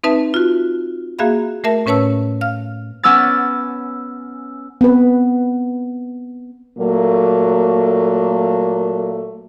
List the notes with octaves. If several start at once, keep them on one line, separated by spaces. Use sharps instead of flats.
C4 D#4 B4 E5 A5
F4 F#4
A#3 F#4 G#4 E5 F5 B5
A3 A#4 E5 A5
A2 C#4 B4 C#5 A5 E6
F5 F6
B3 C#4 D6 E6 F6 A6
B3 C4 B4
A#2 F#3 A3 A#3